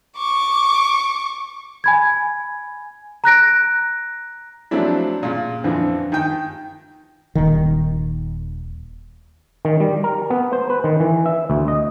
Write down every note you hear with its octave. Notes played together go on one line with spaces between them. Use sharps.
C#6 D6
G#5 B5 G#6
A#5 F#6 A#6 D7
F3 F#3 A3 C4 D4 E4
A#2 C#3
F2 D3 E3 F3
D#3 G5
D#1 D#3
D#3
G3
A#4
B3
C5
B4
D#3
E3
E5
D2
D#5